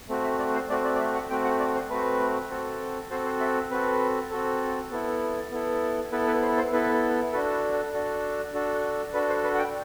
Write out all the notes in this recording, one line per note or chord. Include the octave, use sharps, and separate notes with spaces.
A3 C4 F#4
E5
D5
C5
A3 C4 F#4 D5
D5
D5
E5
F#5
A3 C4 F#4 G5
F#5
D5
C5
A3 C4 F#4 B4
C4 F#4 A4
C4 F#4 A4 C5
C5
E5
C4 F#4 A4 B4
C4 F#4 A4
B3 E4 A4
B3 E4 A4
B3 E4 A4 B4
B4
C5
C5
B3 E4 A4 B4
D4 F#4 A4 B4
A4
D4 F#4 A4
D4 F#4 A4
D4 F#4 A4 B4
C5
B4
F#5
G5